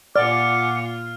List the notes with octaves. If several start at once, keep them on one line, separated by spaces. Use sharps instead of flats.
A#2 F4 D5 F#5 G#5 D6 F6